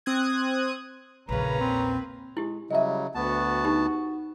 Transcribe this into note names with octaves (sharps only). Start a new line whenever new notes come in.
C4 D#6 F#6 G#6
A#1 E2 C#3 A#3 C#4 B4 A#5
C4
G#3 E4 G4
C#3 F#3 G3 D#5 E5
D2 B3 F#4 A5
D#4 G4